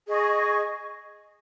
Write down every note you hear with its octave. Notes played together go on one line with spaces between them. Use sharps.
G#4 D#5 C#6